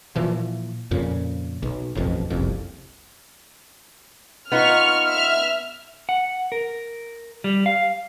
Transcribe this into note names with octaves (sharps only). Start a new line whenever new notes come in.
A#2 E3 F3
F2 A#2 C#3
B1
E1 A1 F2 B2
F#1 C2 F2
B3 D#4 F4 C#6 F6
E5 F6
F#5
A#4
G3
F5